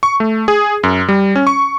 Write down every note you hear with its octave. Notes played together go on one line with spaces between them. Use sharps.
C#6
A3
G#4
F#2
G3
C#4
C#6